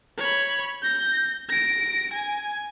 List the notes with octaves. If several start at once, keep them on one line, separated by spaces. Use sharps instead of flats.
C#5 B5
G6 A#6
A#6 D7
G#5